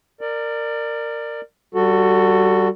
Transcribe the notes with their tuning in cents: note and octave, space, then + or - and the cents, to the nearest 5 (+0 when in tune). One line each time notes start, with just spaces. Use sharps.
A#4 -15 D5 +20
G3 -20 F#4 +0 A4 +20